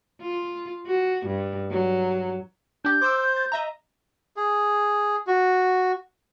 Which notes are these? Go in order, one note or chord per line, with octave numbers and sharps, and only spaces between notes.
F4
F#4
G2
F#3
D4 G4 G6
C5 D6 E6
G6
A6
D#5 E5 A#5
G#4
F#4